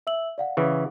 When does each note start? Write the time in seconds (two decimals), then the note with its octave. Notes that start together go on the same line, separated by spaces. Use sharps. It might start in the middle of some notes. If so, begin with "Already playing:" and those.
0.07 E5 E6 F#7
0.38 D5 F5 F#5
0.57 C#3 E3